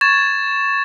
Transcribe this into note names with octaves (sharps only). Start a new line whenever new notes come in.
C#6 G#6 A6 E7